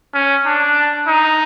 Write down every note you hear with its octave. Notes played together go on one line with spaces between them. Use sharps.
C#4
D4
D#4